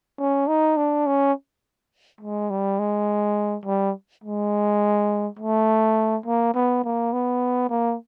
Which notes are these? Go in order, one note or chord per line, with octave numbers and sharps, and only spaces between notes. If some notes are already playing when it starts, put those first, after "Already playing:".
C#4
D#4
D4
C#4
G#3
G3
G#3
G3
G#3
A3
A#3
B3
A#3
B3
A#3